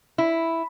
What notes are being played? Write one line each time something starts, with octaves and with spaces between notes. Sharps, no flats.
E4